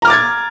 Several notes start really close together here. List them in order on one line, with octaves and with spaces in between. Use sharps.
A#5 F6 D6 A6 G#6